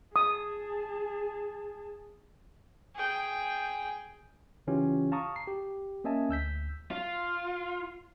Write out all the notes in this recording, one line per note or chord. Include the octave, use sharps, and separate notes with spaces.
G#4 A5 D#6
G#4 G5
C#3 E3 C#4 F4 G4
F5 A5 A#5 C#6 D#6
C7
G4
A#3 C#4 D#5 E5 G#5 A5
D2 E6 G6 B6
F4